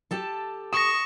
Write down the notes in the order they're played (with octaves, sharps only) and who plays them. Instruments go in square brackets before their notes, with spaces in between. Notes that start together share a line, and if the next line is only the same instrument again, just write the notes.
[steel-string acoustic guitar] G4 A4 A5
[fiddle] C#6 [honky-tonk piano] D#6 [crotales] A#6 E7